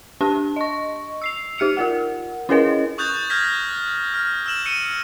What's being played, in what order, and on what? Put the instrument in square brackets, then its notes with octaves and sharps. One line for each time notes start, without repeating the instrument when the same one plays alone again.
[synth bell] D4 G4 A5
D#5 C#6
E6 C7 F7
D#4 G4 F6 C#7 F7
F4 A#4 F#5
C#4 E4 G#4 A#4 B4 D#5
[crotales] C#6 D#6 F#6 G6 A6 F7
F6 G6 G#6 A#6 B6
F6
E6 F6 E7 F#7
E6 C#7 D#7